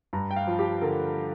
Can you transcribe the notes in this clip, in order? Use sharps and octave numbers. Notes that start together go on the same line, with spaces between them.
G2 A#5
G5
F5
F3
G4
D3 A#4